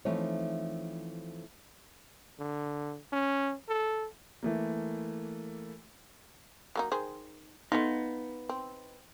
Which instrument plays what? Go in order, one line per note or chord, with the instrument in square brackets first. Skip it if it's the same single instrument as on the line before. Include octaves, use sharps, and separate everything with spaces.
[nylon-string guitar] E3 F3 A3 C4 D#4 C#5
[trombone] D3
C#4
A4
[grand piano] E3 A3 A#3
[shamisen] F#3 A#3 D#4
D#3 G#4 C5
[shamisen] A3 F4 [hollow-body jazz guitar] B3 D#4
[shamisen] C4